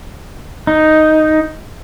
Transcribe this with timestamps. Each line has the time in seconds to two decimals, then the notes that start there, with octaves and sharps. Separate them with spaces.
0.67 D#4